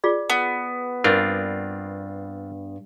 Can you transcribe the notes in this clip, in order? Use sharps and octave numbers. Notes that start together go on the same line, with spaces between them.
F4 G#4 D5
B3
G2 C4 D4 F4 A#4